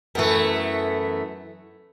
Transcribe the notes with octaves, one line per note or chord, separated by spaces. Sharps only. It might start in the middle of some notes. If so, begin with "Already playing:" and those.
F#2 E3 A3 B3